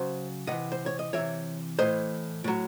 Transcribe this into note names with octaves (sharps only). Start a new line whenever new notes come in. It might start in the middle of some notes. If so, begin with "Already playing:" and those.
Already playing: C#3 F#3 C5
C3 E3 D#5 F#5
C5
C#5
D#5
C3 E3 C#5 E5
A2 E3 C5 D#5
A2 F#3